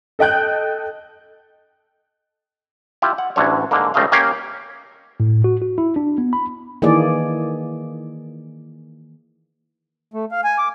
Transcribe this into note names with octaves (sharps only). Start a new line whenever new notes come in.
A4 D#5 G5 F#6 G6
E4 F4 G4
F#5
A1 D2 D3 C#5
G#2 D3 A#3
C#2 G3 A3 D#5 F5
A#3 C#4 G4 C#5 F5
A2
F#4
F#4
E4
D4
B3
B5
D#3 E3 A#3 G#4 D5
A3
F5
G#5
D6